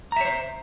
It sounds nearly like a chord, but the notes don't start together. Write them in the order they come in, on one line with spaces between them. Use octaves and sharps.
A#5 E5 C#5 C5